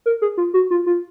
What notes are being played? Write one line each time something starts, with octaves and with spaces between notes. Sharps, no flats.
A#4
G#4
F4
F#4
F4
F4